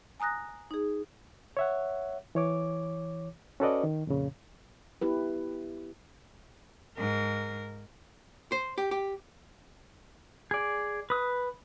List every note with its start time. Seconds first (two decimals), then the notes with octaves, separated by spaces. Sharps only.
0.20 G#5 A#5 D#6 F#6 A#6
0.71 D#4 G#4
1.57 C#5 E5 F#5
2.35 E3 C#5 D6
3.60 C#4 F#4 A4 B4 D5 D#5
3.83 D#3
4.07 F2 A#2 C#3
5.02 B3 E4 G4 B4
6.97 G#2 A#4
8.52 C5
8.78 G4
8.91 G4
10.51 G#4 D5
11.10 B4 D#6